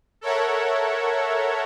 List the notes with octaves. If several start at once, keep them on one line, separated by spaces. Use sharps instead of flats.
A4 A#4 C#5 E5 F#5